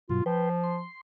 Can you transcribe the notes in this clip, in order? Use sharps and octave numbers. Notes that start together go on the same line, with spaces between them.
G2 B2 F#3 F4
F3 B4 C5 G5
C6